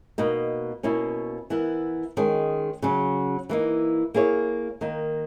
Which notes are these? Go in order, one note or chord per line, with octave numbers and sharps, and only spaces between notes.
B2 A#3 D#4
B2 A#3 C#4 E4
E3 B3 E4 A#4
D#3 G#3 C#4
C#3 F#3 C#4
E3 A#3 D#4
A#3 E4 G#4 C#5
D#3 A#3 D#4